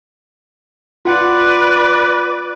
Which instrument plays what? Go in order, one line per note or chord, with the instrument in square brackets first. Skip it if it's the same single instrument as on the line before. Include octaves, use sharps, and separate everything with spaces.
[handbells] F4 F#5 [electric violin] B4 D5